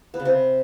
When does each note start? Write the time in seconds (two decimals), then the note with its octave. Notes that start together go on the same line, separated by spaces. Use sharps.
0.14 B3
0.20 C#3
0.25 C3